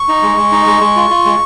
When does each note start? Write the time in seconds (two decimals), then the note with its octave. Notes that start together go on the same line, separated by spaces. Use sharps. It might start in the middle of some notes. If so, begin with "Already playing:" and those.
Already playing: C#6
0.08 D#4
0.23 G#3
0.37 G#3
0.52 D#4
0.66 G#3
0.80 G#3
0.96 F4
1.10 F4
1.25 G#3